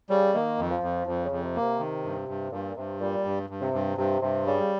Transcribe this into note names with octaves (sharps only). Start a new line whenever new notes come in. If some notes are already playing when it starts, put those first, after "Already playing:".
C#3 G3
D#3 A#3
F2
F3
F2
F2 F3
C#3
F2
C3
A#3
C3
D#3
G2
G2
G2 A#2
G2 C3
A#2 G3
G2
G2
C3
G2
G2 C3
G2 C3
C#3 G3